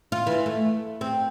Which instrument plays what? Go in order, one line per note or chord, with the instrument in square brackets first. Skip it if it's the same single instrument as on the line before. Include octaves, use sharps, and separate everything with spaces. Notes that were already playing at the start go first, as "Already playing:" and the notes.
[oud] F4
E3
A3
C4